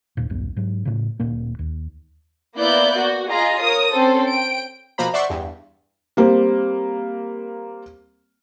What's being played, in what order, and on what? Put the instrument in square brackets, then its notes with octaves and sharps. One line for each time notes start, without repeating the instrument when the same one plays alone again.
[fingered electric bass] D1 D#2 A#2
B1 E2 G2
G#2 F#3
A2 C#3
D1 A#2 A#3
D#2
[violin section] A#3 B3 E4 D5 F#6 G6
F#4
F4 G#4 D#5 A#5
A#4 C#5 D#6
C4 C#4 A4 C5
G5 D7
[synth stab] B2 F3 A#3 C5 A#5 B5
C5 D5 E5 F#5 C6 C#6
E2 G2
[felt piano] G3 A#3 C4